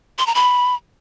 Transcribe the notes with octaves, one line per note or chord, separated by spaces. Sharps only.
C6
A#5
B5